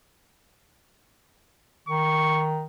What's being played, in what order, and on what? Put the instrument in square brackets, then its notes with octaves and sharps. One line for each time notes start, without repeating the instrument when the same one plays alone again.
[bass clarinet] D#3 [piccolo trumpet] C#6